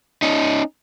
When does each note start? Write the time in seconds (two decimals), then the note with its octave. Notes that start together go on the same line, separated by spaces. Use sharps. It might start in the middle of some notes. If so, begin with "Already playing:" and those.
0.22 C#4 D#4